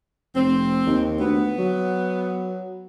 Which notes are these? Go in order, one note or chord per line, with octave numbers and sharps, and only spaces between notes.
F1 C4
D#2
D2 B3
F#3